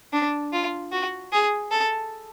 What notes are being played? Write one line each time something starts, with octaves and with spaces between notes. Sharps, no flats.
D4
F4
F#4
G#4
A4